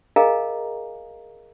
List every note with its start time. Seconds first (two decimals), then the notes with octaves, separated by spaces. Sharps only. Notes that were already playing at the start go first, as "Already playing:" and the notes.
0.16 G#4 A#4 D#5 F5 G#5 A#5